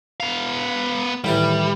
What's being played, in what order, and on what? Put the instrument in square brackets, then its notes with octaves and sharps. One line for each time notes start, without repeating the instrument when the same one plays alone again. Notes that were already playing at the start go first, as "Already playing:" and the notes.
[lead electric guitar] B3 F5
[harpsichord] D#2 A2 E3 [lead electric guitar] G3